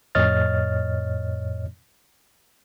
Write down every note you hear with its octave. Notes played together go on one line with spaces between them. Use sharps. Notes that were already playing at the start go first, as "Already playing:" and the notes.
F2 A2 C#5 D#5 F6 A6